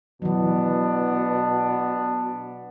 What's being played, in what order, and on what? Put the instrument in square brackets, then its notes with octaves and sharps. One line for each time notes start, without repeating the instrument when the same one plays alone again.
[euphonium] B2 [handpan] E3 F#3 [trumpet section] B3 D4